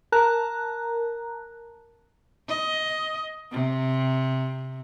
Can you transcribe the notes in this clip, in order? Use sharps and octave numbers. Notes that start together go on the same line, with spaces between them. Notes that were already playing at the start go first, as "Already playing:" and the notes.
A#4 A5 A#5 F#6
D#5
C3